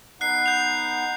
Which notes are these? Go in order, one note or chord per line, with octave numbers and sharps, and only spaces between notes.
B3 D#4 F#5 F#6 C7
G6 F7